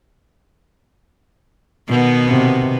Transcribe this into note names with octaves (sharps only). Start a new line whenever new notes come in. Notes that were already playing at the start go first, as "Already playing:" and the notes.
B2 D#3 B3
C3